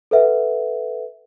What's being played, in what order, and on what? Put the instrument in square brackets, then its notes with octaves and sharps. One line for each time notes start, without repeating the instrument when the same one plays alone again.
[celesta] A4 B4 E5 F#5